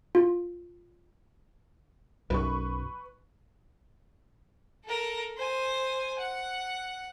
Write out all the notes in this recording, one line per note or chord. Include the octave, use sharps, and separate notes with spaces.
F4
B1 F#2 B4 C#6
A4 A#4
C5 G#5
F#5